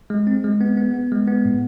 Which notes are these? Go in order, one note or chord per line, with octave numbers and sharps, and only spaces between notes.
G#3
C4
G#3
B3
B3
B3
G#3
B3
A2